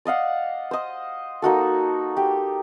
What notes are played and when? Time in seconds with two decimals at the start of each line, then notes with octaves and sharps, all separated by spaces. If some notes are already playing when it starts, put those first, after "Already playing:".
0.05 D5 D#5 F5 F#5
0.71 C5 D#5
1.42 A#3 D#4 F#4 A4
2.17 G4